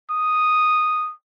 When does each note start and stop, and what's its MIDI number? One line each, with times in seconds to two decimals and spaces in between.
0.10 1.12 87